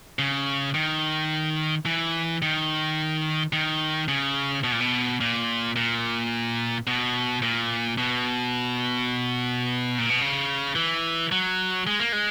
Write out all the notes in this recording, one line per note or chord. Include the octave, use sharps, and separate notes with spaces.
C#3
D#3
E3
D#3
D#3
C#3
B2
A#2
B2
A#2
A#2
B2
A#2
B2
A#2
B2
C#3
E3
F#3
G#3
A#3
G#3